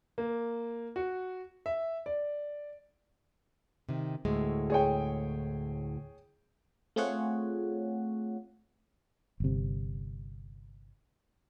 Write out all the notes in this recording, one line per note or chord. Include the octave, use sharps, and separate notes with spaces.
A#3
F#4
E5
D5
C3 D#3
D2 A2 G#3
G#4 C#5 G5
A3 C4 F4 G#4 C#5 F#5
G1 C3